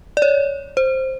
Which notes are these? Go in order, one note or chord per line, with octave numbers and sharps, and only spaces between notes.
D5
C#5
C5